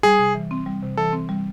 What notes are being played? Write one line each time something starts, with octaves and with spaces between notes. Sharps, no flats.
G3 G#4
C3
E3
C4
G3
C3
E3 A4
C4
G3